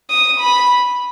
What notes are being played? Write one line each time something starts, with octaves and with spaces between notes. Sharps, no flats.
D#6
B5